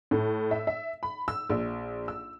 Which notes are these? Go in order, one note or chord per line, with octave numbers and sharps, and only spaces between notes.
A2
E5
E5
B5
E6
A#1
E6